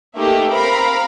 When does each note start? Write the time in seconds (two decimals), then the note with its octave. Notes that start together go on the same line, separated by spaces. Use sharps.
0.17 A3 A#3 D#4 G4 E5
0.51 C4 A#4 F5 A#5 B5